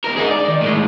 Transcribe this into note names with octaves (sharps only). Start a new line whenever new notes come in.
D2 A#4
D#4 G#4
D5
D#3
A2 G#3